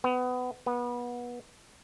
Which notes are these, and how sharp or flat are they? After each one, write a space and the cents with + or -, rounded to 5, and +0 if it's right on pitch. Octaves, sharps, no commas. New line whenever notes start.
B3 +25
B3 -25